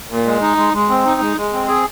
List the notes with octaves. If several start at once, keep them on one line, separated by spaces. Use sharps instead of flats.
A#2
G#3
D#4
G#3
G#3
C4
D#4
G#3
G#3
C4
G#4